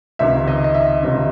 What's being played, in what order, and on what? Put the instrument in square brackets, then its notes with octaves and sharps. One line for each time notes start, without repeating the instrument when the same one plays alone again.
[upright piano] C#2 C3 D#3 E5
D#5
D#5
E5
C#2 C3 D#3